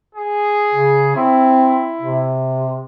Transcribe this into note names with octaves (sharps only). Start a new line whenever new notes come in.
G#4
C#3
C4 E4
C3